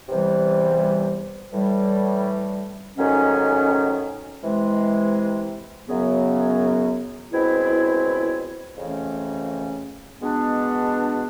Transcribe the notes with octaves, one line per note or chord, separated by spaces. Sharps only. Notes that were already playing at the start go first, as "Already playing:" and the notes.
E2 C3 E3 G3
A2 E3 G3
G#2 D#3 F#3 A3 C#4
C3 E3 G#3
F#2 C#3 F#3 B3
C#2 B2 G#3 C4 E4
F2 C#3 E3 A3 C#4
B2 G#3 B3 D4